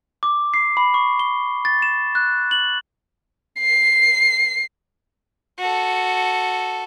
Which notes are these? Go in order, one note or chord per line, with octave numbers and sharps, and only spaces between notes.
D6
C7
B5
C#6
G7
A6
E7
F#6
F#7
C7
F#4 A4